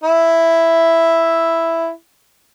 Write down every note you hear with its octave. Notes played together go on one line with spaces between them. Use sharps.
E4 E5